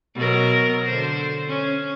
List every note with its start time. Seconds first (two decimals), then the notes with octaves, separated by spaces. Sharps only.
0.15 B2 F#3 A#4
0.86 D3 C5
1.48 C#4